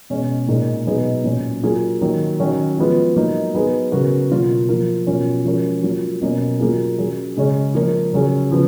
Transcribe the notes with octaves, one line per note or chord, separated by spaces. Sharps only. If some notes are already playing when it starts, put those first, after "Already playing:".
B2 G#3 C#4
A#2 G#3 D#4 A#4
B2 F#3 B3 D#4 G#4
A#2 F#3 C#4
F#3 A#3 F4 G#4
D#3 F#3 A#3
D#3 F#3 C#4 F#4 A#4
F3 G#3 B3 F4
F#3 A#3 D#4
F#3 B3 D#4 G#4
C#3 F#3 B3 F#4 A#4
B2 F#3 A#3 F4
F3 A#3 F4 A#4
B2 F#3 C#4 F4 A#4
F3 G#3 C#4 F#4 A#4
F#3 A#3 F4
B2 F#3 A#3 C#4
F#3 A#3 F4 G#4
F#3 C#4 G#4
C#3 G#3 C#4
F3 A#3 F4 A#4
C#3 F#3 C#4 G#4
C#3 F3 B3